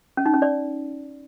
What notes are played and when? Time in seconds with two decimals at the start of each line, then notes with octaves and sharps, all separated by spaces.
0.17 C#4
0.26 D#4
0.34 C#4
0.42 D5